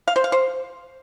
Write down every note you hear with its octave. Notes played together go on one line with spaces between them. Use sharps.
F5
C5
F5
C5